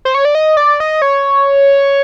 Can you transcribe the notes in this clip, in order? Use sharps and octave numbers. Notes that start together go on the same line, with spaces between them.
C5
C#5
D5
D#5
D5
D#5
C#5